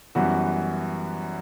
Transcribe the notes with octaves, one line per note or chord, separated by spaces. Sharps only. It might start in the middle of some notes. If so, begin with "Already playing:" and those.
F#2 E3 G3 B3 F#4